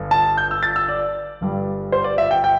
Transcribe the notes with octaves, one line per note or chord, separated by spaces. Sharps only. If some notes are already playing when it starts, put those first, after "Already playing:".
Already playing: G1 G2
A5
G6
E6
A6
E6
D5
G1 G2 G3
C5
D5
E5
G5
G5